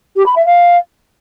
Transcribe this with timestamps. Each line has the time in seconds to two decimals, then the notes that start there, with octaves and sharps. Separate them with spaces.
0.16 G4
0.25 B5
0.35 E5
0.45 F5